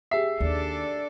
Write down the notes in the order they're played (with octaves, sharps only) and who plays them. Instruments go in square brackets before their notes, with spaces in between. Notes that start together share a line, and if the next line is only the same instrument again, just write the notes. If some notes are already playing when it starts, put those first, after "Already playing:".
[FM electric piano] G4 G#4 C7 [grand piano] E5
[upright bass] D#2 [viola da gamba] D4 A4 D5